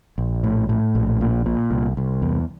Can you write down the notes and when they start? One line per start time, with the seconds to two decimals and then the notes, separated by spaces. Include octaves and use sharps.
0.18 A#1
0.44 A2
0.69 A2
0.95 A#1
1.21 A#2
1.46 A#2
1.71 C2
1.97 C2
2.22 E2